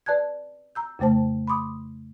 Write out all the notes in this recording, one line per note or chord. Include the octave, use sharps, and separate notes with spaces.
B4 D5 A5 F#6 G#6
A#5 E6 G6
F2 C#3 A3 C5 A5
B5 C6 D6 D#6